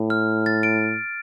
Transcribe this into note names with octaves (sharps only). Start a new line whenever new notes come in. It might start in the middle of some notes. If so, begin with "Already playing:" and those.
Already playing: A2
F6
A6
D7